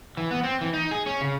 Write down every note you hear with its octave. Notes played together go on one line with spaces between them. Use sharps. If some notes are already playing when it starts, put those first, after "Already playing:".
E3
B3
C4
E3
D#4
G#4
C#4
C#3